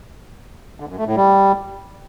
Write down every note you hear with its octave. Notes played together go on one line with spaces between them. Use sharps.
D3
F#2
A3
A2
G3